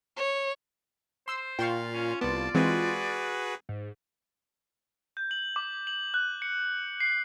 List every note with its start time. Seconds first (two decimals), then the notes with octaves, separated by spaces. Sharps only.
0.16 C#5
1.28 C5 C6 E6
1.59 A#2 F4 F5 G5 C6 C#6
1.94 C#4
2.21 C2 B3 D5 A5
2.55 E3 G#3 C4 F#4 G#4 B4
3.69 G#2
5.17 G6
5.31 F#7
5.56 D6
5.87 F#7
6.14 F#6
6.42 C#7
7.00 C7